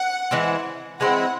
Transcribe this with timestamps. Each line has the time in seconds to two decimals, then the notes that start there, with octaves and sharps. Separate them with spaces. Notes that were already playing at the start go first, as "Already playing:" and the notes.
Already playing: F#5
0.31 E3 G#3 C4 E4
1.00 E3 G#3 C4 E4 F#5